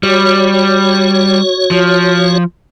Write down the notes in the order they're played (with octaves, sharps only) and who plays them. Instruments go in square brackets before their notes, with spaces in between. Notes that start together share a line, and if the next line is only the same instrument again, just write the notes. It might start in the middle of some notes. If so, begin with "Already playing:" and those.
[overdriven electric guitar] G3 [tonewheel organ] F#4 C#5
[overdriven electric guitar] F3